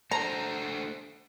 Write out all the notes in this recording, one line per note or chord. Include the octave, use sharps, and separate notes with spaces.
A3 D4 C5 A#5